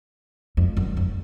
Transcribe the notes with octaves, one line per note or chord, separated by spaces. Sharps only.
F2
F#2
F2